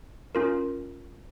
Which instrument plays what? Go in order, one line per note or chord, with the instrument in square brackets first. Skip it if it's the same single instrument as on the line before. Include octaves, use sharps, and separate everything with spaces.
[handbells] C#4 F4 A#4